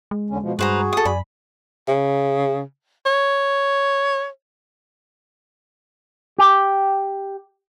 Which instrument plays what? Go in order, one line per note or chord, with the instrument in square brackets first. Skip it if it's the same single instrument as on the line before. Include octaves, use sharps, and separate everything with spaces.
[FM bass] G#3
[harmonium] E2 D3 C#4
B2 F3
[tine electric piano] G2 G3 [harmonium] F#4 G#4 [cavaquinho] B4 C5 A#5
[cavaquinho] A4 D#6
[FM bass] F#2 [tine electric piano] D5 G#5 [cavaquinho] B5
[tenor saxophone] C#3
C#5
[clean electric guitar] G4